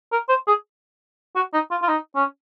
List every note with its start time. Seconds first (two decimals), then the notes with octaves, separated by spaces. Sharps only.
0.12 A#4
0.29 C5
0.47 G#4
1.35 F#4
1.53 D#4
1.71 F4
1.82 F4
1.88 D#4
2.15 C#4